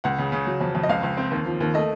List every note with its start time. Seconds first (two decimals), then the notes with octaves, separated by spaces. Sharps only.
0.04 C#2 F#5
0.19 C#3
0.32 C#3
0.47 F#3
0.61 F2
0.75 F2
0.83 D#5
0.89 C#2 F5
1.03 C#2
1.17 C4
1.31 D#2
1.46 F3
1.60 D#2
1.74 A3 D#5